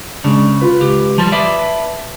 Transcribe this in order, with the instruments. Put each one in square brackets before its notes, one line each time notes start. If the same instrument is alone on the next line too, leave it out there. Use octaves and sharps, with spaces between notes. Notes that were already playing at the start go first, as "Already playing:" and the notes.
[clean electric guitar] C#3 [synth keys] G#3 D4
[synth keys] F4 B4 B5
[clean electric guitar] C#2 G4
[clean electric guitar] F3 G3 [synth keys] A5
[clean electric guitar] B4 D5 E5